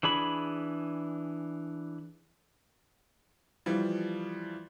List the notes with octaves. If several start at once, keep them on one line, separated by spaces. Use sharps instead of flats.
E3 D4 G#4 B5
E3 F3 G3